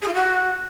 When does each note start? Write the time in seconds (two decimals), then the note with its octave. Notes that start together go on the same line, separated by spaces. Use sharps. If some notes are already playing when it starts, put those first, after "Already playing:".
0.02 G#4
0.08 F4
0.14 F#4